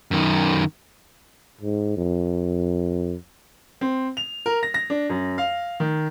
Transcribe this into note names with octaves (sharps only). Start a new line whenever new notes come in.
F#2 D#3
G#2
F2
C4
F7
A#4
A#6
A#6
D4
F#2
F5
D#3